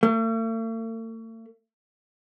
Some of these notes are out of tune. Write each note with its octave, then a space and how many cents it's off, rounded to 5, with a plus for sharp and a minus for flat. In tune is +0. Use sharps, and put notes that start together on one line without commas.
A3 +45